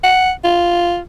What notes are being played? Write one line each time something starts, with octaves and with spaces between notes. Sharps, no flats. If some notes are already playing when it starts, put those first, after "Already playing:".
F#5
F4